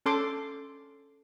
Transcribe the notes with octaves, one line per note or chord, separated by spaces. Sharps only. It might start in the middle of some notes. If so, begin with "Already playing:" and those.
C#4 A4 C6 D6